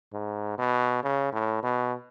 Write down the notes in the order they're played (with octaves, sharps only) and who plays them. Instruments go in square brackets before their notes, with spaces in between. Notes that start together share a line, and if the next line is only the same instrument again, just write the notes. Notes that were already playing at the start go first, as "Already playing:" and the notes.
[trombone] G#2
B2
C#3
A2
B2